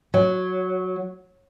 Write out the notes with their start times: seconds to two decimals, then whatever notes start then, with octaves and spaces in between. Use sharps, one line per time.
0.14 F#3